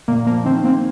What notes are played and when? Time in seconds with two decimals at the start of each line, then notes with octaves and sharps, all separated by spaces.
0.08 A#2 A#3
0.27 F3 A#3
0.45 D#3 C4
0.64 A#3 C4